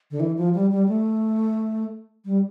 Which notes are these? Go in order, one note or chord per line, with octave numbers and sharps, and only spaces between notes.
D3
E3
F3
G3
G3
A3
G3